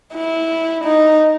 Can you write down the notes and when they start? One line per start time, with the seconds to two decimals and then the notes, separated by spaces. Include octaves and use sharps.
0.14 E4
0.84 D#4